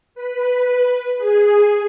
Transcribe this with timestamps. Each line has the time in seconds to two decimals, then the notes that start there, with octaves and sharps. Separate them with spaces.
0.15 B4
1.18 G#4